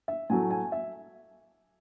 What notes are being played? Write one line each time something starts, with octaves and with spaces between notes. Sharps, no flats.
E5
A2 F#3 A3 G#5
G#5
E5